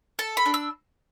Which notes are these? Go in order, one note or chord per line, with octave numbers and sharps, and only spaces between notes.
A4 A5
B5
D4
E6